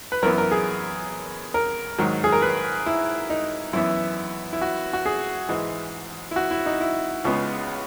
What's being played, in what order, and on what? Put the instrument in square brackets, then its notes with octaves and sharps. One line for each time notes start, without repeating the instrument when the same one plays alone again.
[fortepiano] B4
F#2 E3 B3 A#4
A#4
G#4
A#4
G#2 D#3 F#3
G#4
A#4
B4
E4
D#4
F#2 E3 B3 E4
E4
F#4
F#4
G#4
G#2 E3 G#3
E4
F#4
E4
D#4
E4
C#2 C#3 G#3 B3